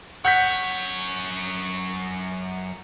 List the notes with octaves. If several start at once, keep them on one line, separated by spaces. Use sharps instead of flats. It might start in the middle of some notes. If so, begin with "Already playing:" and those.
F#2 C#5 F#5 G6 B6